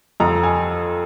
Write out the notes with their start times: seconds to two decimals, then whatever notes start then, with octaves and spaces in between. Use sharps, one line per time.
0.20 F2 A#5
0.43 G#5